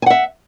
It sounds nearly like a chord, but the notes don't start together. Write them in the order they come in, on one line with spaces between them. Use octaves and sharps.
G#5 F#5 E5